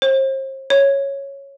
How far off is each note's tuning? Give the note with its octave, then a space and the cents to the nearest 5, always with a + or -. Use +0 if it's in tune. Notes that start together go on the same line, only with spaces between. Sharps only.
C5 +40
C#5 -5